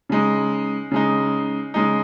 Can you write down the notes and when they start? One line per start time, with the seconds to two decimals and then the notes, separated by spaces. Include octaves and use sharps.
0.09 C#3 G#3 D#4
0.91 C#3 G#3 D#4
1.74 C#3 G#3 D#4